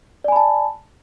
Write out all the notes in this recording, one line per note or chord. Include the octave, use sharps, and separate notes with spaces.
D5 G#5 A5 B5